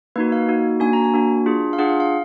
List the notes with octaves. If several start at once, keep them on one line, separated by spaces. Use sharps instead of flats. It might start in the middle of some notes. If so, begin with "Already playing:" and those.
A#3 D#4 F#4 B4
F5
A#3 D#4 F#4
A#3 D4 F#4 G#5
A#5
G#5
A#3 D4 F#4
D4 F4 G#4
F5
D4 F4 G#4 F#5
F5
F5